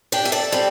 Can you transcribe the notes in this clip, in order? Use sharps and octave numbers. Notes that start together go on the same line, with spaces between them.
D4 G4
E5
A4 D5
G3 C4